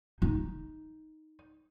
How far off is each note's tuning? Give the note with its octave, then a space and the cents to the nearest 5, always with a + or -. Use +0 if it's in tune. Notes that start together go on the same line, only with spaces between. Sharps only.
D#4 +5